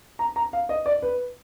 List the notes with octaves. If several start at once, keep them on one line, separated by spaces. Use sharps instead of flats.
A#5
A#5
F5
D#5
D5
B4